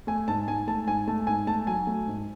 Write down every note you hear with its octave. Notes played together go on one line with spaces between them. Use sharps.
A3 G#5
G#2 A5
G#2 G#5
A3 A5
G#2 G#5
A3 A5
G#2 G#5
A3 A5
F#3 G#5
A3
G#2